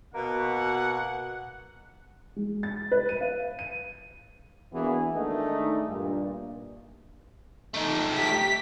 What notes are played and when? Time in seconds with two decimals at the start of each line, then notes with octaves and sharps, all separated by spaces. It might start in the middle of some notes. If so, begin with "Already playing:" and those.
0.14 B2 A#3 F#5
2.36 G#3
2.63 A6
2.91 B4
3.09 D#7
3.21 F5
3.59 D#7
4.73 E3 A#3 B3 D4 F#4 G#4
5.14 D#3 G#3 A3 D4 D#4
5.87 G2 A#2
7.74 A3 D#4
8.13 G4 B6